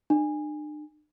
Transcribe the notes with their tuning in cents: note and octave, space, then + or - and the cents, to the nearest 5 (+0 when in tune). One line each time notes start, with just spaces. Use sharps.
D4 +45